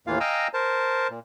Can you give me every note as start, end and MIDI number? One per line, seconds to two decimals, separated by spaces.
0.07 0.19 39
0.07 0.19 45
0.07 0.19 52
0.07 0.19 58
0.07 0.19 65
0.07 0.19 77
0.20 0.48 75
0.20 0.48 77
0.20 0.48 79
0.20 0.48 80
0.20 0.48 82
0.20 0.48 88
0.54 1.08 70
0.54 1.08 72
0.54 1.08 81
1.10 1.19 46